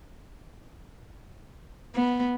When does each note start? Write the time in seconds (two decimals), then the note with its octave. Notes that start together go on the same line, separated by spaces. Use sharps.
1.95 B3